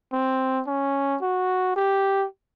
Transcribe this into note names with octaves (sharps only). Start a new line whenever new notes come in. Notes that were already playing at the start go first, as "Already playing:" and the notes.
C4
C#4
F#4
G4